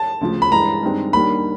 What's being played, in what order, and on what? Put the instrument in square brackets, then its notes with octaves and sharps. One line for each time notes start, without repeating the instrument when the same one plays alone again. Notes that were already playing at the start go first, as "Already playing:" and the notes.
Already playing: [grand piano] A5
[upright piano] D2 C#3 F3
[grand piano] B5
[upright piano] G2 E3 G#3 [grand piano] A#5
[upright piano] G2 D#3 G#3 C4
[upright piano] D#2 D#3 G3 A#3 D4 [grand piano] B5